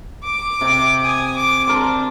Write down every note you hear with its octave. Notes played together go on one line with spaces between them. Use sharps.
D6
C3 G5
G#5 D#6
D6
C4 D4 A#4 C5